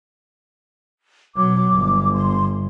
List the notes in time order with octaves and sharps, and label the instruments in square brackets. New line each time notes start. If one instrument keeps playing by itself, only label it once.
[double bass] B2 F#3 [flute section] D6
[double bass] G1
[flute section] C6